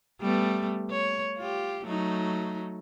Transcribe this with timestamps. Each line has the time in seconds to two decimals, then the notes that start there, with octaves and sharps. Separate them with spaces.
0.21 G3 A3 B3
0.91 C#5
1.37 F4 G4
1.85 F#3 A3 D#4